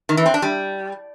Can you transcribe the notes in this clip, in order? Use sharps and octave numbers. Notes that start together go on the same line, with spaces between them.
D#3
E3
C4
D4
G3